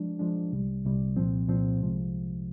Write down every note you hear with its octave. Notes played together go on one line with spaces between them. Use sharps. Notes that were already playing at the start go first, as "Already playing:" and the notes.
Already playing: F3 G#3 D4
F3 G#3 D4
C2 C3 G3
C2 C3 G3
C2 A#2 F3 C4
C2 A#2 F3 C4
C2 C3 F3 G#3